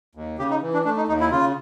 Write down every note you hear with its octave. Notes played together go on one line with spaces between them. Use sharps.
D#2
C#3 G4
D#4
E3
D4
A3 D4
D#4
D#2 D#4
E4
C#3 F4